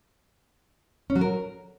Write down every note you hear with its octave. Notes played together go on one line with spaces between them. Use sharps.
C#4
F#3
A#4